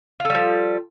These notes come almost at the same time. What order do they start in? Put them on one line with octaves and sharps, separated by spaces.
F4 A4 G3 F3